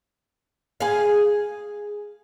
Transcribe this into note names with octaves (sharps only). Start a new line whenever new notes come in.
G#4 F5